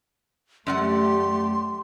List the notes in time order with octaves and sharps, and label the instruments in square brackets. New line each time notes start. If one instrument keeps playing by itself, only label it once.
[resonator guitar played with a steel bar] F#2 D5 F#5 [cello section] A3 G4 [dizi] C6